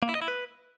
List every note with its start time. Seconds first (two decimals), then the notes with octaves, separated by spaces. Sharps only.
0.03 A#3
0.09 E4
0.15 D#5
0.22 E4
0.28 B4